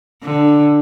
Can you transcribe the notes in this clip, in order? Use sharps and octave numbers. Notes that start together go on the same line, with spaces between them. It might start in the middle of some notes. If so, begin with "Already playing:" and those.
D3